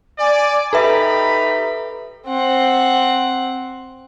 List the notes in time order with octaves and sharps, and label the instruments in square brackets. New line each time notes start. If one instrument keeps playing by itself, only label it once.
[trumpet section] D5 [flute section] G#5
[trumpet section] D#4 B5 [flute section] G4 A#5 [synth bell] A4 B4 E5
[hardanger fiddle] C4 F#5